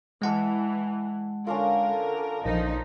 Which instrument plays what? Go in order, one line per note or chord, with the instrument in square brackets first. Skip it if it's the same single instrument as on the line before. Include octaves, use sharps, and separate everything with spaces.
[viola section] E3 [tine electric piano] G#3 F#5 A5
[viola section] D3 A#4 [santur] C#4 D4 F4
[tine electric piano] A#1 [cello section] F3 D#4